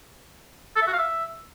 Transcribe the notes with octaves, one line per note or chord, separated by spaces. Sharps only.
A4
E5
F#4
F5
E5